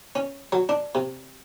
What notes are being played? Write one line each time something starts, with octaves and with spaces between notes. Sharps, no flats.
C#4
F#3
D4
C3